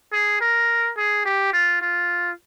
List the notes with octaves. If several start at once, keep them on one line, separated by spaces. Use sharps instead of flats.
G#4
A#4
G#4
G4
F4
F4